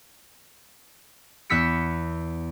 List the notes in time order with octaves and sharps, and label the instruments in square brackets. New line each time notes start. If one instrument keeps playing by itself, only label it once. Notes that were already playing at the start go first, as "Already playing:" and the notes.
[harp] E2 B3 E6 B6 C#7